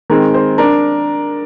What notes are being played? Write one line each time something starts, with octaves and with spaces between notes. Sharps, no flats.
D#3 G#3 C4 A#4
C5
D4 A#4